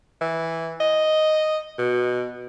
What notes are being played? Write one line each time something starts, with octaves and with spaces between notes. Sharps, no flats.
E3
D#5
B2